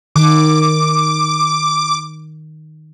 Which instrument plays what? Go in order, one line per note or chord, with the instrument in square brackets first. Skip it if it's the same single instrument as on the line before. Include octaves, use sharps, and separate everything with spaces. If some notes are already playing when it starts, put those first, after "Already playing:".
[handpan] D#3 [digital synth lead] D6